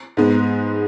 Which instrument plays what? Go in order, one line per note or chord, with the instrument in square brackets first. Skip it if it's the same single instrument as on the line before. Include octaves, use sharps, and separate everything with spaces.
[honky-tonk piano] G#2 G#3 B3